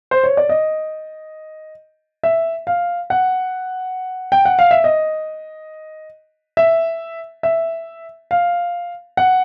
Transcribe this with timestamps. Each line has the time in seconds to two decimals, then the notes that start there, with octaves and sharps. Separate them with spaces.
0.11 C5
0.24 C#5
0.37 D5
0.49 D#5
2.23 E5
2.67 F5
3.10 F#5
4.32 G5
4.45 F#5
4.59 F5
4.71 E5
4.84 D#5
6.57 E5
7.43 E5
8.31 F5
9.17 F#5